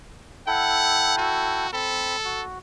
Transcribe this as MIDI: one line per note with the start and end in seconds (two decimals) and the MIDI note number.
0.47 1.67 64
0.47 1.67 69
0.47 1.17 78
0.47 1.67 79
1.17 1.73 66
1.73 2.16 60
1.73 2.43 69
1.73 2.16 83
2.25 2.58 66